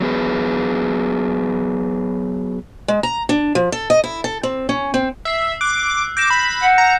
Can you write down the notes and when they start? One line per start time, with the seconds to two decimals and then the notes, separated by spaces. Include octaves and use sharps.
0.01 F#3 B3 G#4 B4
2.88 G#3
3.03 A#5
3.29 D4
3.55 F3
3.72 A4
3.90 D#5
4.04 E4
4.24 A4
4.43 C4
4.69 C#4
4.94 C4
5.25 E5 E6 C7
5.61 D6 F#6
6.17 D6 G6 A#6 E7
6.30 B5
6.62 F#5
6.78 A#5